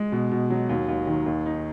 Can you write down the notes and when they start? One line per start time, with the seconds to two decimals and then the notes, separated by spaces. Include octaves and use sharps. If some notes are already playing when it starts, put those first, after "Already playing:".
Already playing: G#3
0.12 B2
0.31 B2
0.50 F#3
0.69 D#2
0.88 D#2
1.07 D#3
1.26 D#2
1.46 D#4